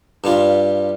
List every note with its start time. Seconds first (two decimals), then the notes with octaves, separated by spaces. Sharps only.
0.24 G2 G3 F4